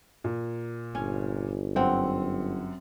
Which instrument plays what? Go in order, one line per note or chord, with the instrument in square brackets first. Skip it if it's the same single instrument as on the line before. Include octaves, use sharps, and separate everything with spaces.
[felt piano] A#2
[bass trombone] G1 [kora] C#4
[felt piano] F#2 F#5 [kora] C4